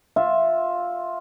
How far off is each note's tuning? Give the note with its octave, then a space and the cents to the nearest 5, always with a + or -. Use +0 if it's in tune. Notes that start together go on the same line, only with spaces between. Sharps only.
F4 +10 E5 +0